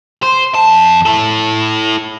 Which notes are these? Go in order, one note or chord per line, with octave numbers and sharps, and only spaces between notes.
C5
F2 A5
E4 A4